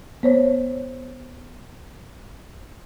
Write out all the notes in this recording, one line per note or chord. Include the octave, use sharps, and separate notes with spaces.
B3 C5 C#5